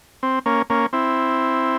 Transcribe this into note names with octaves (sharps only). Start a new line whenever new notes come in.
C4
A#3 C#4
A#3 C#4
C4 E4